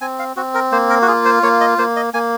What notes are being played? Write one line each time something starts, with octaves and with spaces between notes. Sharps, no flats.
C4 G#5
F5
C4 F#4
A#4
A#3 C5
A#4
F#4
F4 G#4
C5
A#3 C#5
D#5
A#3 C5
D#5
A#3 G#5